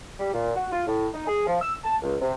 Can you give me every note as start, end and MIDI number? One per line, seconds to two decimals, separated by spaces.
0.20 0.33 55
0.34 0.52 46
0.56 0.67 66
0.72 0.84 65
0.87 1.07 45
1.14 1.26 63
1.28 1.45 68
1.47 1.58 53
1.62 1.76 88
1.84 1.96 81
2.03 2.17 37
2.22 2.33 48